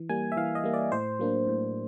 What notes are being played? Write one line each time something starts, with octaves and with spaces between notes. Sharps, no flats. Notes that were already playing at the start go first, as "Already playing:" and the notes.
Already playing: E3
G3 A#3 G#5
E5
E3 F5
D#5
G3 A#3
D5
A2 C5
F#3 A#3 D4
A2